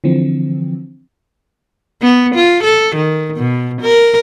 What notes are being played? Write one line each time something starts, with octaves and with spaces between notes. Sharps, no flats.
D3 E3 F3 C4
B3
F4
A4
D#3
B2
A#4